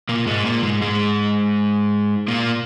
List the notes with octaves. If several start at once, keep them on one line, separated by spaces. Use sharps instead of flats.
A#2 A#3
G#2 G#3
A#2 A#3
G#2 G#3
G#2 G#3
A#2 A#3